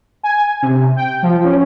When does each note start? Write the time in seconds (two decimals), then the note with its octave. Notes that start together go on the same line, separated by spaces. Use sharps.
0.23 G#5
0.63 C3
0.96 G5
1.23 F3
1.44 C#4